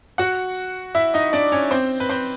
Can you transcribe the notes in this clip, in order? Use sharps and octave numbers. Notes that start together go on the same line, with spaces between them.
F#4 F#5
E4 E5
D#4 D#5
D4 D5
C#4 C#5
C4 C5
B4
C4 C5